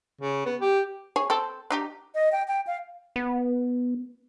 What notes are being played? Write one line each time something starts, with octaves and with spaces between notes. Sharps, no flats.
C#3
B3
G4
G#4 C#5
C4 A4
D4 D#4 G4
D#5
G5
G5
F5
B3